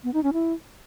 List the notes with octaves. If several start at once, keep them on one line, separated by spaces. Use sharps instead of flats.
B3
D#4
C#4
E4